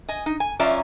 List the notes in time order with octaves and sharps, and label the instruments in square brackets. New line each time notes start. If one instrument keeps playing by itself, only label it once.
[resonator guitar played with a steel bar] D#5 G#5
D#4
G#5
F#2 C#4 F4 D5 E5 A#5